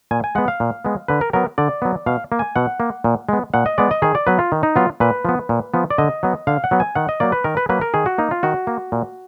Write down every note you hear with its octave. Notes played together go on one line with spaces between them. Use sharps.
A#2 G#5
G#5
G#3 B3 F#5
F5
A#2
G#3 B3
D3 B4
A#4
F#3 B3 A#4
D3 D5
F#3 B3
B2 F5
A#3
G#5
B2 F#5
A#3
A#2
G#3 B3
A#2 F#5
D#5
G#3 B3 D5
D#5
D#3 G#4
D5
F#3 B3 B4
F4
D#3
D#4
F#3 B3 F4
A#2 B4
F3 B3
A#2
F3 B3
D5
D3 D#5
F#3 B3
D3 F5
F#5
F#3 B3
G#5
D#3 F#5
D#5
F#3 A#3 D5
B4
D#3 A#4
B4
F#3 A#3 B4
A#4
D#3 G#4
F#4
A#3 D#4
F4
D#3 F#4
A#3
A#2